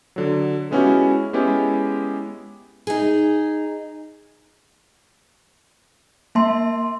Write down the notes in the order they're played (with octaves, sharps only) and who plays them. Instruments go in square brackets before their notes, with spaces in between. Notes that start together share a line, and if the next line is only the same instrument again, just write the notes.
[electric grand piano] D3 F#3
G#3 B3 C#4 E4 F#4 G4
G#3 B3 C#4 E4 G4
[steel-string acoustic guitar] D#4 G#4
[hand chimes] A#3 E5 A5 C6